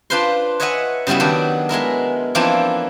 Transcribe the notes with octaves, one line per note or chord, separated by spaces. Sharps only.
D4 F4 B4 C5 C6
B4 C#5 D#5 E5 F#5 G#5
C#3 G3 B3 E4 F#4
D#3 F#3 D4
G#3 B3 E4 A#4
E3 F3 A#3 C4 D4 E4